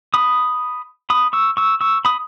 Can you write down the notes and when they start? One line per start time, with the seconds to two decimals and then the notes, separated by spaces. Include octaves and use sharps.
0.14 B5 D#6
1.10 B5 D#6
1.33 C#6 E6
1.57 C#6 E6
1.81 C#6 E6
2.05 B5 D#6